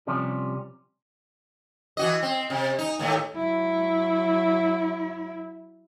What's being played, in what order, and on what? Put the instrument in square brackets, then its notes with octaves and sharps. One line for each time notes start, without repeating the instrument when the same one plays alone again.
[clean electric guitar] C3 F3 G3 C#4
[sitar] E3 F#4 D#5
C4
C3
D#4
D#2 A2 A3
[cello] F#3 E4